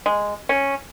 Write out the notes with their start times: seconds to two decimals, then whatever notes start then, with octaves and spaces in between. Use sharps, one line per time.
0.06 G#3
0.49 C#4